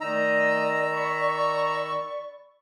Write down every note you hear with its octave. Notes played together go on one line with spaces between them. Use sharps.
D#3 A3 D#4 D5 D#5 A#5 E6
B5 C#6